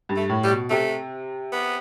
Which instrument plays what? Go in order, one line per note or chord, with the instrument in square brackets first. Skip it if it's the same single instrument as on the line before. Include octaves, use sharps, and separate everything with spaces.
[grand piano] G2
[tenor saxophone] A3
[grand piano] A2
[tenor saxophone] G3
[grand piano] B2
[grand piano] C3 [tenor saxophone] A3
[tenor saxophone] B3